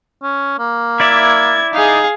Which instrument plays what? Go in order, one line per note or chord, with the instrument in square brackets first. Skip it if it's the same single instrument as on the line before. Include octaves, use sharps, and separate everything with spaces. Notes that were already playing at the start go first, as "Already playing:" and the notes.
[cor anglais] C#4
A#3
[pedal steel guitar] E4 D5 E5 [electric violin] G#6
[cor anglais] D#4 [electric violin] G#4 F5